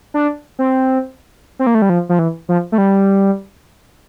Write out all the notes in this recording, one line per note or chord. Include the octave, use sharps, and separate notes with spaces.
D4
C4
C4
A#3
A3
G3
F3
F3
E3
F3
A3
G3